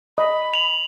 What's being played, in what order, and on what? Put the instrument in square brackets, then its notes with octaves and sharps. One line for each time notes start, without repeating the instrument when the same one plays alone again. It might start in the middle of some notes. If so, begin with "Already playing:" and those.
[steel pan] D#5 [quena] B5
[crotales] F7 F#7